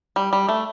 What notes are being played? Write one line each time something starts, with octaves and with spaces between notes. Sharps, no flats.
G3
G3
A3